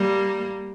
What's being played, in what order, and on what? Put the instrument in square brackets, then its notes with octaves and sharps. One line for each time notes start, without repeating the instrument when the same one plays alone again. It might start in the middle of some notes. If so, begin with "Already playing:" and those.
Already playing: [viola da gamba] G3 A#3